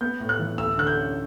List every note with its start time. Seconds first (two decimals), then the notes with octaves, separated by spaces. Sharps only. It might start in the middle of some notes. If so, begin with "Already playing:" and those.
0.01 B3 G6
0.20 A2
0.29 F#6
0.39 E3
0.58 D2 E6
0.78 D3 F#6
0.87 G6
0.97 C#4